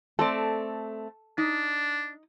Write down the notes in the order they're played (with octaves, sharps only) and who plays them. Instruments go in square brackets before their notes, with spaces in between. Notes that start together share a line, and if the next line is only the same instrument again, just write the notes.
[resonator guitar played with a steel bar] A3 C4 D5 [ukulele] A4
[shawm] D4 [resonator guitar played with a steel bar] D#4